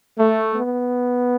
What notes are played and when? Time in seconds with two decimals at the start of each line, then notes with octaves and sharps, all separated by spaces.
0.18 A3
0.56 B3